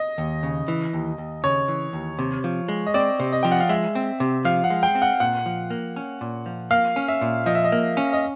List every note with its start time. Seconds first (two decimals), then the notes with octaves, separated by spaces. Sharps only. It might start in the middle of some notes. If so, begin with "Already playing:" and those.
Already playing: D#5
0.18 D#2
0.43 C#3
0.68 E3
0.93 D#2
1.18 D#2
1.44 C#3 C#5
1.68 E3
1.93 D#2
2.19 C3
2.44 F3
2.68 G#3
2.86 D#5
2.94 C4 D5
3.20 C3
3.32 D#5
3.43 F3 G5
3.51 F#5
3.60 F5
3.69 G#3 E5
3.95 C4
4.20 C3
4.45 F3 F5
4.64 F#5
4.70 G#3
4.83 G5
4.95 C4
5.02 F#5
5.20 A#2 F#5
5.46 F3
5.70 A#3
5.96 C#4
6.21 A#2
6.46 F3
6.71 A#3 F5
6.96 C#4
7.08 E5
7.21 A#2
7.46 F3 D#5
7.55 E5
7.64 D#5
7.72 A#3
7.97 C#4
8.13 D#5